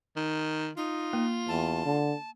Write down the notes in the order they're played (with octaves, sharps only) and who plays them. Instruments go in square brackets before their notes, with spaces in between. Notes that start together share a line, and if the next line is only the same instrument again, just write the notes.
[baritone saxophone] D#3
[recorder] D#4 [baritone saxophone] F4
[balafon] A#3
[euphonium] E2 [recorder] A5
[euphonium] D3